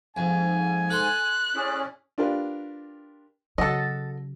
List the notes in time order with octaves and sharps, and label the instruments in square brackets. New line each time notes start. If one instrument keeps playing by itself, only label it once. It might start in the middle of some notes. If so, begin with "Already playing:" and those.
[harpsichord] F2 [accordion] G#2 [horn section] G#5
[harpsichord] A4 C6 [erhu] F#6
[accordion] C#4 [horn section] E4 G#4 D5
[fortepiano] D4 F4 G4 A#4 B4
[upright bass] C#3 [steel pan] F#3 [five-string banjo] A4 D#5 [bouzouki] F#5 A5